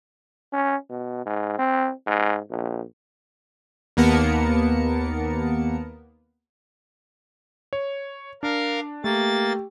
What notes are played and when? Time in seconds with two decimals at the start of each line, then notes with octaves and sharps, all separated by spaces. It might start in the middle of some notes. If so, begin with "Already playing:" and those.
0.53 C#4
0.90 B2
1.25 G#2
1.58 C4
2.06 G#2
2.50 A#1
3.97 D#2 A#3 B3 A#4 A5 C#7
7.73 C#5
8.43 D4 A#4 F5
9.04 A3 A#3 G4 A6